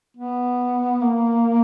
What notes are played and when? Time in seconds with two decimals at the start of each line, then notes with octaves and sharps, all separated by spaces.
0.17 B3
1.02 A#3